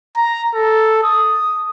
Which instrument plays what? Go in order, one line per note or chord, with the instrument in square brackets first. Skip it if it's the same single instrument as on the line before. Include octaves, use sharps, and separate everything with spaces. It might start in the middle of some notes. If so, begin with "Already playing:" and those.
[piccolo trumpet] A#5
A4
D#6